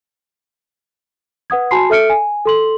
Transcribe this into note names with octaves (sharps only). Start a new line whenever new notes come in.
B4 F#5 D#6 G#6
F#4 G#5 A5 B5 C6 C7
A4 E5 F6 C#7 D7
G#5
A4 C6 F#7